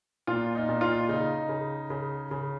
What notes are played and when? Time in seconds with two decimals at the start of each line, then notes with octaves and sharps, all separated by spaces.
0.27 A#2 F4
0.55 D#4
0.69 A#2
0.81 F4
1.09 C#3 D#4
1.49 C#3
1.90 C#3
2.31 C#3